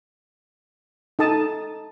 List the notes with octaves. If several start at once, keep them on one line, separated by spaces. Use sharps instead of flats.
D#4 A4 A5 D#6